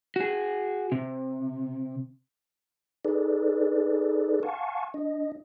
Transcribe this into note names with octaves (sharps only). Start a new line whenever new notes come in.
F#4 G#4
C3
D#4 G#4 A4 B4 D5
F5 F#5 G#5 A5 C#6
D4 D#5